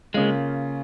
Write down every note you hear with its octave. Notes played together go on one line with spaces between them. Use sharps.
C#3 G#3 A#3 C#4 F4